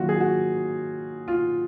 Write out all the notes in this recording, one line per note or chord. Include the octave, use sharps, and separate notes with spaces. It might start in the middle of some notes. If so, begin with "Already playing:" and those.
Already playing: D#3 F#3 A#3 F4 F#4
G#4
F#4
F4